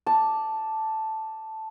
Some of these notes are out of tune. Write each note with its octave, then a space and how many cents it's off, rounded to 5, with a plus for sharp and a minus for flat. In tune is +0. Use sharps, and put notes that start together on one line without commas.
D5 +0 A5 +0